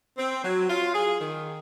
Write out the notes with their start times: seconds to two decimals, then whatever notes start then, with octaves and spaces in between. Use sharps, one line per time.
0.17 C4
0.43 F#3
0.69 F4
0.94 G#4
1.20 D#3